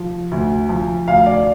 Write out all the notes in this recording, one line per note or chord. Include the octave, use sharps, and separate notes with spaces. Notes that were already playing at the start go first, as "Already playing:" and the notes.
Already playing: F3
D2
F3
D2 F5
D5